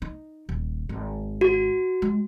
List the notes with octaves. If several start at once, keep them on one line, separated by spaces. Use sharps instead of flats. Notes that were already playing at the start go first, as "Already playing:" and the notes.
D#4
D#1
G#1
F#4
G#3